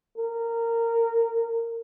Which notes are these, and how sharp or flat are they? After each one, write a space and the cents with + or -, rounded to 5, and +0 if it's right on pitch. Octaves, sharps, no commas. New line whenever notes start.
A#4 -15